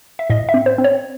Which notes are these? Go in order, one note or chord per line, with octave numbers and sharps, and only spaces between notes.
E5
A2 D#5
E5
C4
C5
C4
C#5